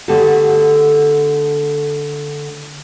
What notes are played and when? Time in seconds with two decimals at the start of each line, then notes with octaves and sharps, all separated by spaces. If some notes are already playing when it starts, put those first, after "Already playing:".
0.08 D3 A3 B3 F#4 G4 A4